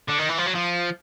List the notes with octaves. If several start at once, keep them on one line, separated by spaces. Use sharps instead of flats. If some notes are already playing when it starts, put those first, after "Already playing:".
D3
D#3
E3
F3
F#3
F3